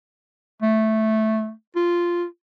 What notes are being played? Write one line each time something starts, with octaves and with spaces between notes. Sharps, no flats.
A3
F4